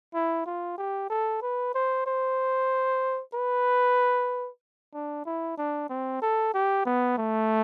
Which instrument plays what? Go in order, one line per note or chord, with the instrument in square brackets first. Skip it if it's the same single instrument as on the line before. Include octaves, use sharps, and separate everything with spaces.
[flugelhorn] E4
F4
G4
A4
B4
C5
C5
B4
D4
E4
D4
C4
A4
G4
B3
A3